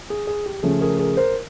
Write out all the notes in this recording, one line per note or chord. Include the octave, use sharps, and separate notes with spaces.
G#4
G#4
G4
C#3 F3 A3 C#4 G#4
G#4 A#4
G#4 A#4
A#4 C5